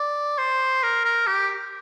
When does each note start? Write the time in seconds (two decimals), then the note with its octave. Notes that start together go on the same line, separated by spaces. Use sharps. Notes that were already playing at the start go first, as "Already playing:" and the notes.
Already playing: D5
0.39 C5
0.83 A#4
1.05 A#4
1.27 G4